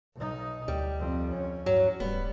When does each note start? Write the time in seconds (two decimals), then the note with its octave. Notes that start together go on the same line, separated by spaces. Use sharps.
0.16 B1 D#4
0.68 D2 G3
0.99 F2 C4
1.30 C#4
1.66 G2 F#3
2.00 D1 G3 B3